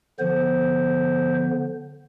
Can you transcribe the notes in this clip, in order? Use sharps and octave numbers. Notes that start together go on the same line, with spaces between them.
D3 F3 B3 C5